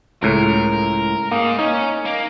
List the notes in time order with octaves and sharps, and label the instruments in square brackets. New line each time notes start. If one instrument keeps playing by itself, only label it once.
[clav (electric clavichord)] C#2 A2 [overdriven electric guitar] A#4
[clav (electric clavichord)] A#3 [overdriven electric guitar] D#4 G#4
[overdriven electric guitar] C#4 [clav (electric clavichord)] D#4
[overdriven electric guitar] A#3